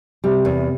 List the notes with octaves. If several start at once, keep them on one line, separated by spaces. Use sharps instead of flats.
C3 G3
E2